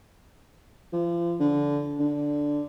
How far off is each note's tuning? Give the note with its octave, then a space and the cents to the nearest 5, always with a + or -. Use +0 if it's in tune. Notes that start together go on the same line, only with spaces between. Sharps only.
F3 -35
D3 -20
D3 -5